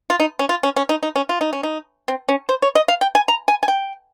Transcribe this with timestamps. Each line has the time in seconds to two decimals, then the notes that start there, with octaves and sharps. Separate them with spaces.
0.10 F4
0.20 D#4
0.39 C#4
0.49 F4
0.63 C#4
0.76 C#4
0.89 D#4
1.03 D#4
1.16 C#4
1.29 F4
1.41 D#4
1.53 C#4
1.63 D#4
2.08 C4
2.29 C#4
2.49 C5
2.62 C#5
2.75 D#5
2.88 F5
3.01 G5
3.15 G#5
3.28 A#5
3.48 G#5
3.63 G#5
3.68 G5